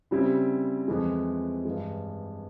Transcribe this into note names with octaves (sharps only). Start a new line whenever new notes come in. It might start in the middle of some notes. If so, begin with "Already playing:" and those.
C#3 G3 C4 E4
F2 E3 G#3
G2 E3 G#3